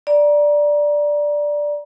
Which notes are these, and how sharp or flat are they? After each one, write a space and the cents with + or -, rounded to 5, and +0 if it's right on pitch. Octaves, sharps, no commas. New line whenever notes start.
D5 +0 A#5 +25